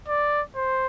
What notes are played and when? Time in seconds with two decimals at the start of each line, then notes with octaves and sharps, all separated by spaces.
0.08 D5
0.56 C5